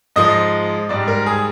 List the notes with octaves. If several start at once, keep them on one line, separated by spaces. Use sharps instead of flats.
G#2 F3 G#3 D#5
G#2 G3 D5
A#4
G#4